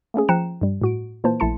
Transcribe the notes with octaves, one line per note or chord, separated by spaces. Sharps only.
A3 A#3 C#4 G#4
F3 G5 A#5 F#6 C#7 E7
G2 G3
A2 F#4 D7
A#2 E3 A#3 C5 A5
A#1 A3 E4 A5 C6 C#7